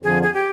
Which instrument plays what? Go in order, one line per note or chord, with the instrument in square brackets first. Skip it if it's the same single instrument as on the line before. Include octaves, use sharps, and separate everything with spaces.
[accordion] F2 D3 F3 [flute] G#4
[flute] G#4
G4